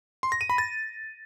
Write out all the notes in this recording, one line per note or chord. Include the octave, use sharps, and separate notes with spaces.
C6
A#6
D#7
B5
A6